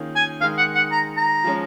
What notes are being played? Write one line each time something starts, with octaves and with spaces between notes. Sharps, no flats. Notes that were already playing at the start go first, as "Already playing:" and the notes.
Already playing: D#3 A#3 C#4 F4 G#4
G#5
D#3 G#3 D#4 F5
F#5
F#5
A#5
A#5
F3 G#3 C#4